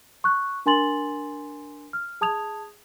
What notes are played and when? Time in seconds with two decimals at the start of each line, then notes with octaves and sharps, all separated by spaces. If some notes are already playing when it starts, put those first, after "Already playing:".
0.24 C#6 F#6
0.66 D4 A#4 G#5 C6 A6 F#7
1.93 F6
2.21 G#4 A5 D#6 G#6 F7